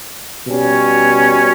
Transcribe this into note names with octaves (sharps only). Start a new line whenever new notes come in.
B2 G3 C#4